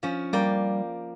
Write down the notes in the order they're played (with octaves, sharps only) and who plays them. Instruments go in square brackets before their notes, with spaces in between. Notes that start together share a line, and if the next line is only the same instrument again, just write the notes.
[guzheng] F3 C#4
[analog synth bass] G3 [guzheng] A#3 D5 G5